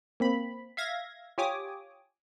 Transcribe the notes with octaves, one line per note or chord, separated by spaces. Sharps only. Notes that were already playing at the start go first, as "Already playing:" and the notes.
A#3 C4 B5
E5 F5 G#6 A#6
F4 G4 C#5 G#5 D6 D#6